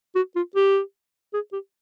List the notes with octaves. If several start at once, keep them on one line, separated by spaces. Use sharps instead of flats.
F#4
F4
G4
G#4
G4